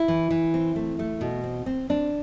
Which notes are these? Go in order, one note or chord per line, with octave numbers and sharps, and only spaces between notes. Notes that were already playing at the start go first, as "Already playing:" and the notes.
Already playing: E4
E3
E3
C4
A3
A3
B2
C4
C4
C4 D4